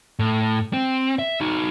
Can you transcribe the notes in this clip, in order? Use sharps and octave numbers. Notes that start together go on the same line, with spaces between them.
A2
C4
E5
D#4 F#4